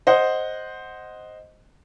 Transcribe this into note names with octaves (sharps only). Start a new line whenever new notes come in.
C5 D#5 F#5